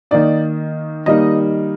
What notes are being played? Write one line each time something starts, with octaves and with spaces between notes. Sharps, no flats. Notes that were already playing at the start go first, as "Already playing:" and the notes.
D#3 A#3 D#4 D5
D#3 G3 A#3 D#4 D#5